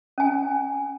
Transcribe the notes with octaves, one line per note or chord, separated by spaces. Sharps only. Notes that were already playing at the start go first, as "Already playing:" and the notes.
C#4 G#5